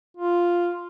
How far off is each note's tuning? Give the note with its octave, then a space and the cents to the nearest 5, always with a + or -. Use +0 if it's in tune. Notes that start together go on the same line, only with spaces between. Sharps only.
F4 +0